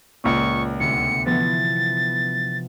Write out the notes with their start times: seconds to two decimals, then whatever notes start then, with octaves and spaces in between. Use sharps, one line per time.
0.24 C#2 A#2 C#6
0.80 D2 C3 B3 C#7
1.26 E3 F3 B3 A6